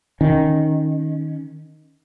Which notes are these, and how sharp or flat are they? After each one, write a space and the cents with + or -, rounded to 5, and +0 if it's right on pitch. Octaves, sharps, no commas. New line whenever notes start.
D#3 +0 C#4 +0